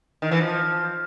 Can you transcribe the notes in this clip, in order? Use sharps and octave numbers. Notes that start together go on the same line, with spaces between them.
D#3
E3
F3